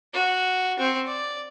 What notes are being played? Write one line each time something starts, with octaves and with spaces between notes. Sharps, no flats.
F#4
C4 C#6
D5